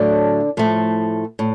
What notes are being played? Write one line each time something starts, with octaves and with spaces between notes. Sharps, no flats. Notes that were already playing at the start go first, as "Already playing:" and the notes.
Already playing: A2 D3 F#3 A3 D4
A2 F3 A3
A2